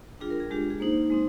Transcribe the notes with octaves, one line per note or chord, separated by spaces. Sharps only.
G3 D4 F4 G#4
A#4
G#4
G#3 D4 F4 G4
G#4
A#3 D#4 C5
G#3 C4 D#4